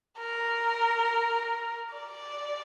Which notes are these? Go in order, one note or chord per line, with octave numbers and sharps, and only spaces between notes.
A#4
D5